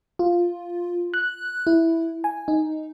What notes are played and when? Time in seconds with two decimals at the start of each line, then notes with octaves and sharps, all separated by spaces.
0.19 F4
1.14 F#6
1.67 E4
2.24 G#5
2.48 D#4